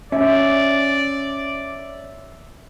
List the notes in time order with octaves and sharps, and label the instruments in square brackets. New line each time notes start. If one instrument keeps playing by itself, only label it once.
[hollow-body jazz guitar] C#4 [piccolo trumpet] D5 [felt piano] E5